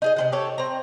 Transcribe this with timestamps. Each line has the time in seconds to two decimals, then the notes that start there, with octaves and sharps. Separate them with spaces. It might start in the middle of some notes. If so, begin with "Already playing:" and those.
0.02 D#4 G#4 D#5
0.16 C3 G#3 F#5
0.32 G4 A4 C#5
0.58 C4 A#5